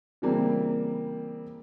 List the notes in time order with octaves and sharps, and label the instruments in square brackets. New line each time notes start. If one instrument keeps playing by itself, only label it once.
[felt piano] C#3 E3 G3 A#3 C4